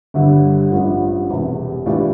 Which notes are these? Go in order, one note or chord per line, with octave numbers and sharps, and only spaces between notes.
G1 G2 D3 G3
A1 G2 F3
E1 E2 C3
A2 E3 G3 D4 F4